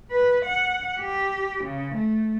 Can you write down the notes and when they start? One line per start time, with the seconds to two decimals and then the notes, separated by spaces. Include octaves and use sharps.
0.11 B4
0.45 F#5
1.00 G4
1.64 C#3
1.95 A3